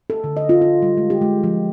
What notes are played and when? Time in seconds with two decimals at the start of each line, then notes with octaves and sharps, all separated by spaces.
0.10 A4
0.24 D3
0.37 D#5
0.49 F4
0.61 F4
0.82 G3
0.97 G#3
1.10 G4
1.22 G#3
1.44 F3